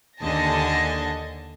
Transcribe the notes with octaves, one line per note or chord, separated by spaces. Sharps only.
D#2 D3 D#5 G#5 A5 A#6